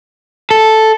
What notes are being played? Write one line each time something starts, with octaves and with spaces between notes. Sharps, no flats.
A4